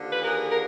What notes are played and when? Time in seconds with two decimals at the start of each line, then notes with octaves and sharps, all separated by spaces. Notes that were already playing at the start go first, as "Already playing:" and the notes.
Already playing: D#2 D3 F3
0.13 B4
0.22 G#4 A#4
0.51 A#4